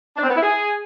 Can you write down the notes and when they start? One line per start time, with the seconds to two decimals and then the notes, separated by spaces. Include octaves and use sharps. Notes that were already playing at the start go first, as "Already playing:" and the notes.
0.17 D4
0.23 C4
0.30 B3
0.36 E4
0.42 G#4